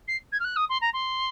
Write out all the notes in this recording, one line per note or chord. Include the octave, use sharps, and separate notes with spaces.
C7
G#6
F6
F#6
D#6
C6
A#5
C6